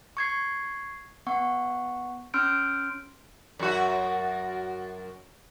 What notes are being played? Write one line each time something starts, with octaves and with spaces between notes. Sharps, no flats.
C#6 G#6 C7
B3 F#5 C#6
C#4 C6 E6 F6 G6 D7
F#2 F#4